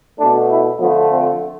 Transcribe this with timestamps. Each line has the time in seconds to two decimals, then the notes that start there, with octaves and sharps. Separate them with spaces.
0.19 B2 A3 D4
0.49 E4
0.80 D3 F3 A3 B3
1.10 C4